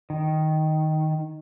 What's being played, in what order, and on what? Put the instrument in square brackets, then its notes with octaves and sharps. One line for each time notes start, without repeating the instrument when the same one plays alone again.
[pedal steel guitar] D#3